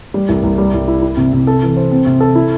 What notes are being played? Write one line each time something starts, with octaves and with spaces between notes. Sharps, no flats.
G3
C2
C2
G3
C2
E4
E4
C3
C3
A4
E3
C5
C4
C3
A4
E4